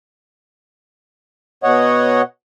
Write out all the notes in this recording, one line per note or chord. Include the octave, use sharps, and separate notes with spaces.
B2 C#5 D#5 F#5